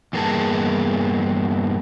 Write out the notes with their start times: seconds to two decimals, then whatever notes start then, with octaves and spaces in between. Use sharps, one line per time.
0.13 E2 G2 A#3 B3 G#4 A5